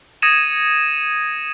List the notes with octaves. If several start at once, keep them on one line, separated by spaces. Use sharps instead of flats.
D#6 G#6 A#6 C#7 D#7 E7